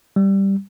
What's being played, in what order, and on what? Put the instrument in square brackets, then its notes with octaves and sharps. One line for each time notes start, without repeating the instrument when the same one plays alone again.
[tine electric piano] G3